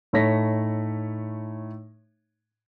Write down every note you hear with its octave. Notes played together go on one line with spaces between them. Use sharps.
A2 A3 D#4 C#5 A#6 B6